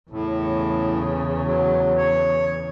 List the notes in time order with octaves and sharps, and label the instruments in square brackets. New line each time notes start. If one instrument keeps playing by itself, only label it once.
[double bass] E2 C#3 [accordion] A2
[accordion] F#3
C#5